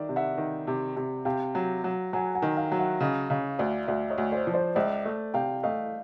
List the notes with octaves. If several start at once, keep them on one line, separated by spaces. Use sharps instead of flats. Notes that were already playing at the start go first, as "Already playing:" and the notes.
Already playing: D#3 D5 E5
C3
E5 F#5
D#3
C3
C3
C3 F5 G5
F#3
F#3
F#3 F#5 G#5
F#5 G#5
D#3
F5 G5
F#3
E5 F#5
C#3 D#5 F5
C#3 D#5 F5
D2 D5 E5
D2 D5 E5
C#5 D#5
D2
C5 D5
F3
C5 D5
C#2 D5 E5
A3
C3 F5 G5
A3 D#5 F5